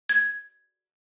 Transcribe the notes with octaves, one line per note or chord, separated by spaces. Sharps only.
G#6